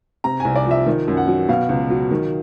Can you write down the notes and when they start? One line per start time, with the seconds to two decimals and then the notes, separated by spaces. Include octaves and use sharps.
0.24 C3 A#5
0.40 C2 G#5
0.56 D5
0.66 F3
0.71 E5
0.86 D#3
1.08 F#2
1.17 F#5
1.28 F#3
1.49 B2 F5
1.69 C#2
1.90 F#3
2.11 D#3